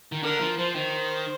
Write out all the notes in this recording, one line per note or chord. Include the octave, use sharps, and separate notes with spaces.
D#3
D3 A#4
F3
F3 C5
D#3